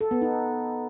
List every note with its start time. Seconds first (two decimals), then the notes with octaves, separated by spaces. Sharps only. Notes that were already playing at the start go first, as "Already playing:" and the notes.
0.01 A4
0.11 B3
0.22 D#4